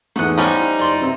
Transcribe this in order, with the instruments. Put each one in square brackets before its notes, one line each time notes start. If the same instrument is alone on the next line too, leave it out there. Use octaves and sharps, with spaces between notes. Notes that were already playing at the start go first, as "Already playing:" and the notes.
[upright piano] E2 G#2 A3 [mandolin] F#5 D#6 F#6
[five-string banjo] F3 G3 C#4 [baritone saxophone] D#4
[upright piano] E4
[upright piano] F#1 F#7 [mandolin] D5 C6
[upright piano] C3 C4